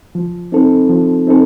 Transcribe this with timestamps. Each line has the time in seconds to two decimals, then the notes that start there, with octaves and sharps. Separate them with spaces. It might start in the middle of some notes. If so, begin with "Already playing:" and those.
0.15 F3
0.52 C4 D#4 A4
0.89 F3
1.27 C4 D#4 A4